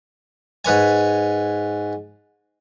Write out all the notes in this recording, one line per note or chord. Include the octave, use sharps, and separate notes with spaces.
G#2 B4 C#5 G#5